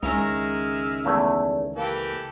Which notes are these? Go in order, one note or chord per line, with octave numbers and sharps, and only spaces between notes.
C#2 D#3 G#3 C#4 E5 A#5 F6
E2 A3 E4
E3 A#3 G4 A4